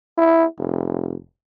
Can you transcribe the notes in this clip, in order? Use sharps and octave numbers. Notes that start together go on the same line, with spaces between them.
E4
F1